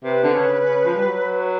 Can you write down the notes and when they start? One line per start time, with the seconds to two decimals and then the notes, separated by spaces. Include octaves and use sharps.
0.04 C3 B4
0.24 D3
0.34 C#3
0.65 C#3
0.85 F3
0.95 G3
1.05 F#3